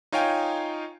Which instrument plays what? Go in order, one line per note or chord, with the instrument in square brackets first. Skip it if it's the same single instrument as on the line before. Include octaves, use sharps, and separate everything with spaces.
[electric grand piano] D#4 F4 C#5 F5 G5 G#5